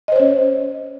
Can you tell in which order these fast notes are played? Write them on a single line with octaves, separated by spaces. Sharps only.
D#5 C5 C#5 C#4